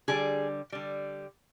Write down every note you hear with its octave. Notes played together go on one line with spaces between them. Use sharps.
D3 G3 G#4
D3 G3